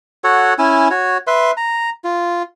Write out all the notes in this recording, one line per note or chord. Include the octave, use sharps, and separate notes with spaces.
F#4 A4 C#5 F#5
C#4 E4 G#5 E6
F#4 C#5
B4 E5 C6
A#5
F4